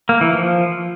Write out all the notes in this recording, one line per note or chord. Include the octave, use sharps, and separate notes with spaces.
A#3
E3
F3